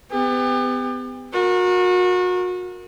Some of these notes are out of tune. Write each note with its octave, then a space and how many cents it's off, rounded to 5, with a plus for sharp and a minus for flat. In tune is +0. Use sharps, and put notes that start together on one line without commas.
B3 +35 G4 +40
F#4 -35 A#4 +0